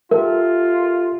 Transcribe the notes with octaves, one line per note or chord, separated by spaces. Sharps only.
F4 G4 A4 A#4 E5